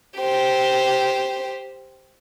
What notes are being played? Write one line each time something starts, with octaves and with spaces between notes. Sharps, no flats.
G4 C5